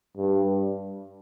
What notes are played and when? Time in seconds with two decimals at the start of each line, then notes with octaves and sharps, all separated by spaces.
0.17 G2